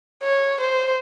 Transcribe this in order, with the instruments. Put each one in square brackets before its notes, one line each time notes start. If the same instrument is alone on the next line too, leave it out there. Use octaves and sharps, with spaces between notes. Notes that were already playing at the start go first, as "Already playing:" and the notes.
[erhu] C#5
C5